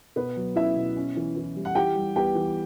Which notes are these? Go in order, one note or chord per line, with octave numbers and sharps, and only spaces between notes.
B2 B3 B4
F#3
C#4 E4 E5
B2
C#4
E3
E3
G3
F#5
E3 G4 G5
G3
B3 G4 G5
E3